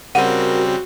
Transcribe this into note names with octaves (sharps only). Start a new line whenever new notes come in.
C#3 G3 C4 F#4 A#4 F#5